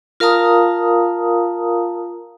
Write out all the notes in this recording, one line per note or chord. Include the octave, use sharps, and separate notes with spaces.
F4 A#4 F5 A5 A#5 D#6